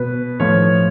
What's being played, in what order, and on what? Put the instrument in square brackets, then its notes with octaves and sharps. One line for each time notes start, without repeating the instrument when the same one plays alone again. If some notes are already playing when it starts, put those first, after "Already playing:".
Already playing: [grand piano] B2 B4
A2 F3 C#5